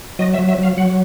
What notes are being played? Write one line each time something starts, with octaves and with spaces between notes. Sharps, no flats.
F#3 D#5
E5
F#3
E5
F#3 F5
F#3 F#5